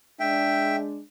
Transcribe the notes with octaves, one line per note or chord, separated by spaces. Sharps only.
G#3 D4 E5 G5